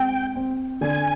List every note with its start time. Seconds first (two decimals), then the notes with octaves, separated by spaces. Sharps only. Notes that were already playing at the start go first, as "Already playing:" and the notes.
Already playing: G#3 C4 G5
0.36 C4
0.81 D3 G#5